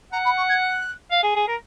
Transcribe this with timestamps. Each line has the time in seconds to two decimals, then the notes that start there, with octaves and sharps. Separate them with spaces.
0.12 F#5 A#5
0.25 B5
0.36 C#6
0.49 G#6
0.61 F#6
1.11 F5
1.23 G#4
1.35 G#4
1.48 A#4